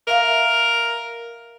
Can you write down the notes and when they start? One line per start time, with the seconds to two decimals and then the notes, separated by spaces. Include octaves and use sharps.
0.07 A#4 E5 F5